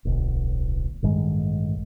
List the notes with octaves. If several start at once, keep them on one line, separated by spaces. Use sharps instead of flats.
D1 B1
A1 G2 D#3 G#3